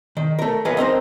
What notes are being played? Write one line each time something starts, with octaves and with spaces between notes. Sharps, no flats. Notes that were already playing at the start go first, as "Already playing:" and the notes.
D#3
A3 A#4
E3 F#3 A#3 G#4 B4 D#5
C4 D#4 A#4 C5